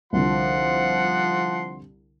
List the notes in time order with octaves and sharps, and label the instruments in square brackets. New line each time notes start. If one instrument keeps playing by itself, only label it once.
[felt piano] C2 D3 [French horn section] F3 [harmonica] F#5 C6